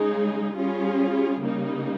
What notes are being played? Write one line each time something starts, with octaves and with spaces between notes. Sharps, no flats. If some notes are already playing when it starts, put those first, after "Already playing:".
Already playing: C#3 G#3 D#4 G#4
G3 C#4 F4 G#4
C#3 G3 A#3 D#4